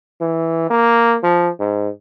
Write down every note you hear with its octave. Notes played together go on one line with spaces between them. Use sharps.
E3
A#3
F3
G#2